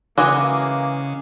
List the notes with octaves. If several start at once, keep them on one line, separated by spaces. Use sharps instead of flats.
C#3 E3 G#3 A#3 F#4 D6 D#6